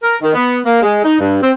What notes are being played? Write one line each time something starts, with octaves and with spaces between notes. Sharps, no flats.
A#4
D#3
B3
A#3
G#3
D#4
G2
C4